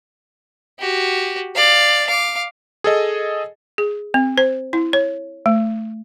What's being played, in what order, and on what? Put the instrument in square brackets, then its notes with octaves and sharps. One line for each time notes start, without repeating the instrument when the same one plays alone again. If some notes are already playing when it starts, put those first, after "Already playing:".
[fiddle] F#4 G4
D5 F5
F5 D6
[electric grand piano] G#4 A4 D#5
[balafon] G#4
C4
C5
E4
C#5
A3